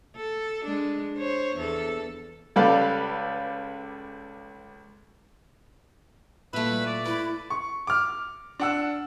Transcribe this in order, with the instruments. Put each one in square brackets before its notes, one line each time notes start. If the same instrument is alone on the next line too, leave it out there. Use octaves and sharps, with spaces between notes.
[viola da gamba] A4
G#3 D4
C5 C#5
E2 A4
[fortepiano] C#2 G3 A4 B4 D5 F5
[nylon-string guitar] A#2 [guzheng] A3 E4 [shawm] B4
[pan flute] G3
[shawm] D5
[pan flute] E4 [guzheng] B4
[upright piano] C#6
D6 F6
D4 F#5 E6